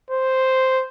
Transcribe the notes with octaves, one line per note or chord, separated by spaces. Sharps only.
C5